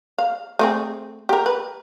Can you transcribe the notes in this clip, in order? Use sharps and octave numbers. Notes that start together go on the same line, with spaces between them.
F5
A3 C4 G#4
G4 A#4
B4